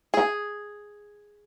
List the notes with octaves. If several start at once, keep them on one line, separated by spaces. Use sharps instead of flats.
G#4